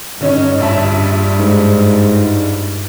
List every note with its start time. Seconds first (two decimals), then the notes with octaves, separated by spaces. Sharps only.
0.21 G2 D3 C#4 D#4
0.60 A#1 E5 A5
1.40 G#2